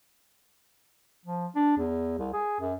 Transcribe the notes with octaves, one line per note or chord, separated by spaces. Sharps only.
F3
D4
E2
C2
G#4
F#2